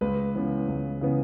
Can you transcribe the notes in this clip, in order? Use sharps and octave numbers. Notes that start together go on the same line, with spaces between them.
C#2 B4
C#3 E3 B3
C#2
C#3 E3 B3